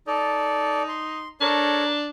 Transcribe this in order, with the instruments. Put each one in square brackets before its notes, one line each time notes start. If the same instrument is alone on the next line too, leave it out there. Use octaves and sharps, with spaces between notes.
[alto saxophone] D#4 [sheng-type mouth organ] A4 D5
[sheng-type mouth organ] C6
[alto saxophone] D4 [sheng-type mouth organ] A4 A#4 C#5